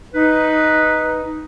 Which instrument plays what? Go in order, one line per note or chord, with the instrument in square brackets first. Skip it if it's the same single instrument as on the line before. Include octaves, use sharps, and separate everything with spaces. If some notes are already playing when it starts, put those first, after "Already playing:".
[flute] D#4 [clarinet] B4